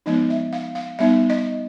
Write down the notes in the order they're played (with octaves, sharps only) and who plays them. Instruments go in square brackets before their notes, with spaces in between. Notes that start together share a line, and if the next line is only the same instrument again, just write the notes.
[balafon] F3 G#3 B3 D#4 D#5
E5
F5
F5
G3 B3 D#4 E5
D#5